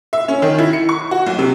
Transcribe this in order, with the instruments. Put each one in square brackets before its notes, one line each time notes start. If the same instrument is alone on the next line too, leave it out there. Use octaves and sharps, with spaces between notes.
[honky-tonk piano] E5
C#4
D#3
E4
C#7
C#6
F#4
B1
C3